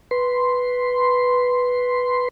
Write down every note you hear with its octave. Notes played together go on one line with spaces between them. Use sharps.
B4 C6